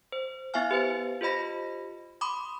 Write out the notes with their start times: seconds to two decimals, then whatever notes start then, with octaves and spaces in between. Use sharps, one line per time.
0.12 C5
0.54 B3 E4 E5 F5 G#5 F6
0.71 G4 B4 C5
1.21 F4 G4 C5 D#5 B5 A#6
2.21 B5 C6 D6 D#6